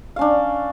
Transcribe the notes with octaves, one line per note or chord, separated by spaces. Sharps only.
C#4 D4 F5